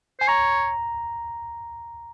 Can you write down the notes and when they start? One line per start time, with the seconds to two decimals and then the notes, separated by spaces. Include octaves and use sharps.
0.21 C5 G#5
0.28 C#5 A#5